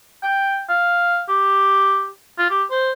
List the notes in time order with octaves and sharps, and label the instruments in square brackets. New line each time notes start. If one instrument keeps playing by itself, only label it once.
[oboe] G5
F5
G4
F4
G4
C5